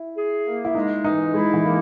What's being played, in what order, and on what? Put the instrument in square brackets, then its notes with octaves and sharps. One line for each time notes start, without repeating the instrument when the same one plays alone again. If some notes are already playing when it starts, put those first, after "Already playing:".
Already playing: [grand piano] E4
[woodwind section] G#4
A#3
[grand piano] E4
[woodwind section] G#3 [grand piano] D#4
[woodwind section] E3 [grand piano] D#4
[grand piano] G#3 [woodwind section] E4
[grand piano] E3
[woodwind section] A#3